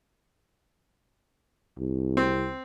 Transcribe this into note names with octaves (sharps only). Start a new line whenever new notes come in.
C2
C4